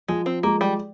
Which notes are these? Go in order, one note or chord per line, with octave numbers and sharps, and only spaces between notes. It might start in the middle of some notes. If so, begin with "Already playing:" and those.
F3 G#3
C4
G#3 A#3
G3